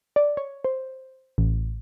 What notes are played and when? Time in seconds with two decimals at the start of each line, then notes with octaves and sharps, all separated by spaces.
0.16 D5
0.37 C#5
0.64 C5
1.38 A1